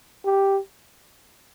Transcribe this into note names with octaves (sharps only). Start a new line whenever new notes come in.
G4